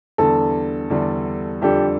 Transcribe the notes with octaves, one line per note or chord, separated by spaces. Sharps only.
E2 D3 G3 D4 A4
E2 D3 G3 D4
F2 D3 G3 D4 G4 A4